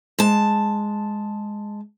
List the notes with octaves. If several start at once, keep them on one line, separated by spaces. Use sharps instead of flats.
G#3 A5